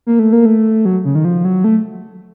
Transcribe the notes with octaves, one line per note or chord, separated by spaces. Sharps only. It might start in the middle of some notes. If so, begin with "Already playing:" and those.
A#3
A3
A#3
A3
F#3
C#3
D#3
F3
F#3
A3